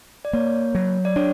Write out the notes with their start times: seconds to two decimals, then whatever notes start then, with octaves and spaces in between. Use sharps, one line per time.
0.25 D5
0.33 A#3 C#5
0.75 F#3
1.05 D5
1.16 D4 C#5